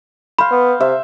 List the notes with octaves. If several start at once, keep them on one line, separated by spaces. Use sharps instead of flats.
C5 F5 B5
B3
C3 E5